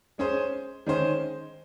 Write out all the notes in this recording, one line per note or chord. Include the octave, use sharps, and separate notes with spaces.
G#3 C#4 G#4 C5
D#3 G#3 C#4 G#4 C5